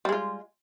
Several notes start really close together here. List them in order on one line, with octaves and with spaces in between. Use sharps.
G3 G#3 F4